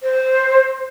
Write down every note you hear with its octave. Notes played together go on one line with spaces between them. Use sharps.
C5